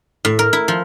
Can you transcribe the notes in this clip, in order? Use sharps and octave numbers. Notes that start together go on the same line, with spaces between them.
A2
A#4
E4
F3